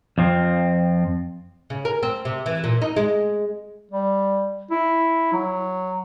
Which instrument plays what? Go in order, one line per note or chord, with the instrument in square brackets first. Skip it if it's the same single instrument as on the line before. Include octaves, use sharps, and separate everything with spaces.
[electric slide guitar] F2 F3 C4
[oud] C#3
A#4
C4
C3
E3
A#2
D#4
G#3
[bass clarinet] G3
E4
F#3